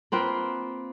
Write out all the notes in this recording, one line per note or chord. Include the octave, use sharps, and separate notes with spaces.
A#3 C4 F4 B4